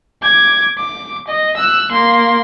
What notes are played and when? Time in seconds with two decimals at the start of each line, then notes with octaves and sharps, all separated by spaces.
0.22 D6 G#6
0.78 D6
1.28 D#5
1.57 E6 F#6
1.91 A#3 C6